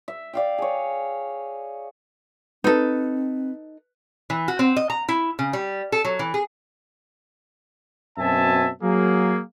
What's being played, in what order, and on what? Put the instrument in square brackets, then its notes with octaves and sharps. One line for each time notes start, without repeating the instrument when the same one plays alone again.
[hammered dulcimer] E5
D5 F5 G5
G#4 C#5
[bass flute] C4 [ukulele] D#4 A4 [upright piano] B4
[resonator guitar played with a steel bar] E3
F#4
C4
D#5
A#5
E4
C#3
G3
A4
F#3
E3
G#4
[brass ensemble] F#2 B2 C4 E5 G#5 A5
F#3 A#3 G#4